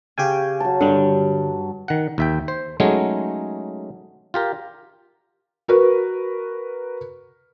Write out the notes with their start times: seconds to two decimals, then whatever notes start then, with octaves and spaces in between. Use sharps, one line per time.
0.18 C#3 G4 G5 G#5
0.60 F#3 A5
0.81 G2 D3 G3
1.88 D#3 F#5
2.18 D#2 E5 G5
2.48 C5
2.80 F#3 G#3 A3 C#4 D#4 G#4
4.34 F4 G4 A#4
5.68 F#4 A#4 B4